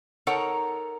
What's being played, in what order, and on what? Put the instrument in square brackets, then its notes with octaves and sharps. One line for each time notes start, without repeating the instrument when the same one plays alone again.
[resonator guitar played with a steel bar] D#4 A4 A#4 C#5 F#5 A#5